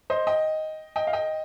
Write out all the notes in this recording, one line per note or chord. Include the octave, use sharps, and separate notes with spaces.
C5 D#5
D#5 G5
D#5 G5
F5
D#5 G5